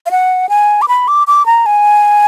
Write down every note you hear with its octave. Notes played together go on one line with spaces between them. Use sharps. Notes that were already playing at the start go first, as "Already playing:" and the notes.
F5
F#5
G#5
D6
B5
D6
D6
A#5
G#5